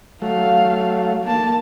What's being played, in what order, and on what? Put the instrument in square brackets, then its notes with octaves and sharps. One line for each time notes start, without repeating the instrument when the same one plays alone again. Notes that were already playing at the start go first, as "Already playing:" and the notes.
[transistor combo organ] F#3 A3 [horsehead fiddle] F5
[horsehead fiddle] A#3 A5